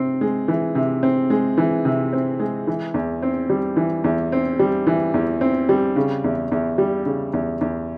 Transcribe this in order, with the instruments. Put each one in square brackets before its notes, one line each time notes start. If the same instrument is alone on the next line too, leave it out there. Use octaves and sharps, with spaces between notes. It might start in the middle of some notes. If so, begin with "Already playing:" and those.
Already playing: [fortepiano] C3 C4
G#3
E3
C3
C4
G#3
E3
C3
C4
G#3
E3
E2
C4
G3
E3
E2
C4
G3
E3
E2
C4
G3
C#3
E2
E2
G3
C#3
E2
E2